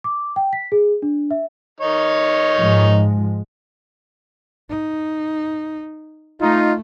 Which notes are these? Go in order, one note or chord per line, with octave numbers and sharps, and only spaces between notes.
D6
G5
B6
G#4
D4
E5
D#3 D#4 C#5
G#2 F3 G#3
D#4
A3 D#4 F4